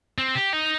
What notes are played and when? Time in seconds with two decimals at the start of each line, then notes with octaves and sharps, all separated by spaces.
0.18 C4
0.35 G4
0.53 D#4